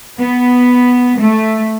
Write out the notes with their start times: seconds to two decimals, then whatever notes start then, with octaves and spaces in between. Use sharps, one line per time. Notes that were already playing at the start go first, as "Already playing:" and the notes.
0.19 B3
1.18 A3